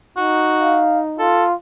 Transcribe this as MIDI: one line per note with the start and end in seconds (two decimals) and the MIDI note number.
0.17 1.39 63
0.17 0.82 66
0.60 1.00 77
1.19 1.54 65
1.19 1.44 69